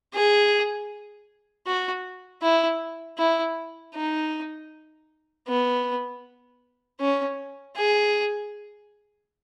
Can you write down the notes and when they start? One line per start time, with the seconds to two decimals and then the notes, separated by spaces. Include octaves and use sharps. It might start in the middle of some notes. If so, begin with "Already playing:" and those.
0.15 G#4
1.67 F#4
2.42 E4
3.18 E4
3.95 D#4
5.48 B3
7.01 C#4
7.77 G#4